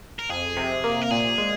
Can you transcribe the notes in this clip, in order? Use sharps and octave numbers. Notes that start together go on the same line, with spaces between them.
A#4
F2 G#4
C3
A#3
A#4
A#2 G#4
G#3